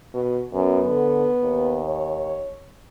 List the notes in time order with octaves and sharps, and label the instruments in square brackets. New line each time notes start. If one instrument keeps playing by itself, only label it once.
[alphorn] B2
[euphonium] F#2 [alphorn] B3
[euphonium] D3
D#2
[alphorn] C#5